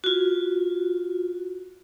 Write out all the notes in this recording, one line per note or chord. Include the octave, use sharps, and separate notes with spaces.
F4 F#4